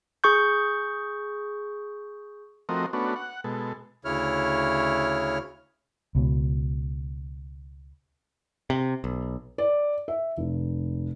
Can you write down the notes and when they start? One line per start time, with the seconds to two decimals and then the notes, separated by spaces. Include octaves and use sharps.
0.24 G#4 C#6 G6
2.69 F3 A3 C4 F#4 A#4 D#5
2.93 A3 B3 C#4 D4 F#4
3.16 F#5
3.44 B2 G#3 A4
4.05 D2 C#3 E4 C#5 F6
6.15 C#2 B2
8.70 C3
9.04 B1
9.58 D5
10.08 E5
10.37 F1